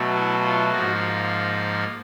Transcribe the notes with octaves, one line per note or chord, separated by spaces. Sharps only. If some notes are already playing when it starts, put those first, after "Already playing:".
Already playing: B2 F#3 A3
E4
F4
G#2 F3 A#3 F#4